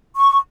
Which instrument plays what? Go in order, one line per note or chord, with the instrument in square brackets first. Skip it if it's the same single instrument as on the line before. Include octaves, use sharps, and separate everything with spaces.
[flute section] C#6